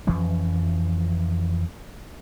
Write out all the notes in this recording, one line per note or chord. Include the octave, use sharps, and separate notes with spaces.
F2 E3 F3 C#4